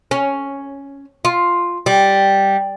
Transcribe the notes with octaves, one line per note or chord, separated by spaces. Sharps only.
C#4
F4
G3